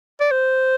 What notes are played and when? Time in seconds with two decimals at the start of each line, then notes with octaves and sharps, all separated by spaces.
0.20 D5
0.31 C5